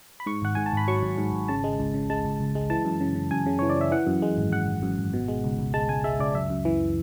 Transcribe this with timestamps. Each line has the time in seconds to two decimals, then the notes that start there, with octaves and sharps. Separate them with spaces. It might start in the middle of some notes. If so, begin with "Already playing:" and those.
0.20 B5
0.26 G#2 C#6
0.42 G#1 F#5
0.55 G#2 G#5
0.66 A5
0.73 G#1 B5
0.88 F#3 C#6
1.03 G#1
1.18 G#2
1.33 G#1
1.48 C#3 A5
1.64 G#3
1.79 C#2
1.94 C#3
2.10 G#3 A5
2.25 C#2
2.40 C#2
2.55 G#3
2.70 E3 A5
2.85 F#2
3.01 C#3
3.15 C#3
3.31 F#2 G#5
3.46 C#3
3.59 E3 C#5
3.70 D5
3.76 E3 E5
3.92 E3 F#5
4.07 F#2
4.22 G#3
4.37 G#1
4.52 F#2 F#5
4.68 G#1
4.82 F#2
4.98 G#1
5.13 B2
5.28 G#3
5.44 C#2
5.59 C#2
5.74 G#3 A5
5.89 C#2 G#5
6.04 G#3 E5
6.20 C#2 D5
6.35 F#2 E5
6.50 F#2
6.65 E3